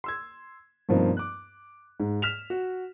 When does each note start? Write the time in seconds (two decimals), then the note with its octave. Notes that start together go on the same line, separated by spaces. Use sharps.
0.04 C6 E6 G#6
0.89 G2 B2 F3 A#3 C4 D#4
1.17 D6 F#6
2.00 G#2
2.22 F6 B6 E7 F7
2.50 F#4